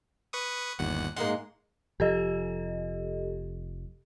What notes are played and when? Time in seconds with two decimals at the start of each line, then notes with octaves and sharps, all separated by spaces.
0.33 B4 C#6 D#6
0.79 G1 D#2 F#5
1.17 G#2 G#3 A#3 F#5 C6
2.00 F1 F3 G4 A4 D#5